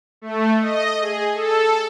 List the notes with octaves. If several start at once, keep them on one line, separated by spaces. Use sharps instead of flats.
A3
D#5
G#4
A4